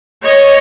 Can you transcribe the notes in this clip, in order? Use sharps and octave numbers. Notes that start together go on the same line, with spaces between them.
C#5 D#5